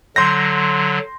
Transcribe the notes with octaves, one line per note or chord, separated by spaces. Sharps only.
D3 F#3 C6 G6 A#6